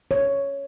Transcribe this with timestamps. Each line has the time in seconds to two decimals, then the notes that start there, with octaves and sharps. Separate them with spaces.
0.11 C#5